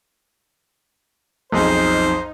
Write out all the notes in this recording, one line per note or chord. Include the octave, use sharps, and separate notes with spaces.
B1 F2 D#4 G#4 C5